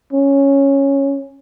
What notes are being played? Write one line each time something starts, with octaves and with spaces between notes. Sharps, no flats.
C#4